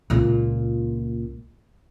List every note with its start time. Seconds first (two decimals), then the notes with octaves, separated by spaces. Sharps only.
0.10 C#2 A#2